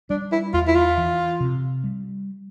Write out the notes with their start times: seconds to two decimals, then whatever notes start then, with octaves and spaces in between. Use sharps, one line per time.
0.10 G3 D4
0.32 E4
0.53 E2 F4
0.67 E4
0.76 F4
0.98 E3
1.40 C3
1.84 G3